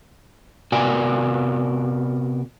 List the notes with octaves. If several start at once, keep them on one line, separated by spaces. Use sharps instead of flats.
C3 B3 F#4 A#4 D5 G#5